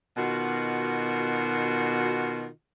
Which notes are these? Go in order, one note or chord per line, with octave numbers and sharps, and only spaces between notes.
B2 D#3 F4 F#4